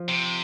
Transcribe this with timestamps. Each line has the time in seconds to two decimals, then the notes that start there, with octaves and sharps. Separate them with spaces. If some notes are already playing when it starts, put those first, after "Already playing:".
Already playing: F3
0.09 C3